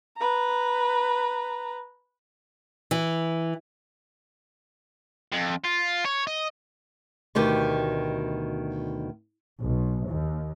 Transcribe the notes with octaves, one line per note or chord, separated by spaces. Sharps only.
B4 A#5
E3
F2
F4
C#5
D#5
D2 B2 D#3 G4
B1
D#2